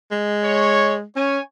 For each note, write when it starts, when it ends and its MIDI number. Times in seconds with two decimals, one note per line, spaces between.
0.12 1.04 56
0.43 0.94 73
1.16 1.39 61
1.16 1.40 73
1.16 1.40 80